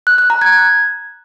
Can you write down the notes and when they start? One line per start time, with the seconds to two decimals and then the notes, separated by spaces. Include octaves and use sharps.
0.07 F#6
0.18 F#6
0.30 A#5
0.42 G#6